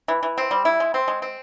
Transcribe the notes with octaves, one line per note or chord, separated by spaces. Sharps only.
E3
E3
C4
G3
E4
G#3
C4
G#3
C4